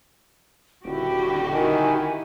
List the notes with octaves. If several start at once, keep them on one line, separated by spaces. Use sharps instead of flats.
D#1 D3 E4 F#4 G4
D#3 E4 F#5 G#5